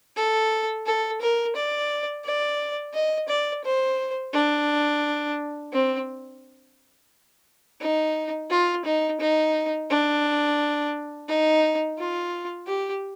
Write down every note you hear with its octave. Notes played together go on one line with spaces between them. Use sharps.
A4
A4
A#4
D5
D5
D#5
D5
C5
D4
C4
D#4
F4
D#4
D#4
D4
D#4
F4
G4